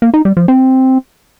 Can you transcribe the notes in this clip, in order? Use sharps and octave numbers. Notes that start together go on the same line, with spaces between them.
A#3
D#4
G3
F3
C4